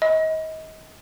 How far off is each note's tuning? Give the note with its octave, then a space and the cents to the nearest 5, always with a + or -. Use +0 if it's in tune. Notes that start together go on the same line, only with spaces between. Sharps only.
D#5 +30 B5 +0